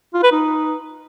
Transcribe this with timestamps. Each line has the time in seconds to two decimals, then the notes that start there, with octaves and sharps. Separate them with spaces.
0.14 F4
0.23 B4
0.32 D#4